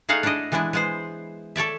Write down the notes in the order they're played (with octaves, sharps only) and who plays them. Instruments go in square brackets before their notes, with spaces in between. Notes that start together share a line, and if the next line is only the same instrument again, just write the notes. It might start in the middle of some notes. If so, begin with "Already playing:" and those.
[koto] A3 D#4 G#4 F5 F#5 A5
D4 E4 A4 D5 D#5
E3 G#3 B3 D4 E4
G#3 B3 C5
A4 C#5 D5 E5